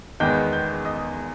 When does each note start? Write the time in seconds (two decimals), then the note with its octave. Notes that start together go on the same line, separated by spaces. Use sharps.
0.20 E2 D#3 G#3 B3 G5 G6
0.53 G5 G6
0.85 D#5 D#6